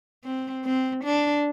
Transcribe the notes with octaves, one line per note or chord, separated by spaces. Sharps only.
C4
C4
D4